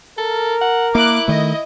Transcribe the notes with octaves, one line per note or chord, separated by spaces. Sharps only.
A4 A#4
F#5
A#3 E4 D6 F#6
D#3 A3 D#5